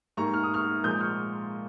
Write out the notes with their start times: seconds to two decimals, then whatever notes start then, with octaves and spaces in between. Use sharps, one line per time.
0.17 G#2 G3 A#3 A#5 C#6
0.34 F6
0.44 D#6
0.54 C#6 F6
0.83 A#2 F3 G#3 D#6 G6
1.01 C#6 F6